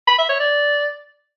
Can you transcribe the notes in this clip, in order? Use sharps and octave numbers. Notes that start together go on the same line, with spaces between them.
B5
E5
C#5
D5